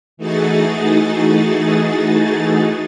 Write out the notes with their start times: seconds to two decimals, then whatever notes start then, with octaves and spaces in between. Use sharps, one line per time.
0.17 E3 A3 D#4 F#4 G#4 A6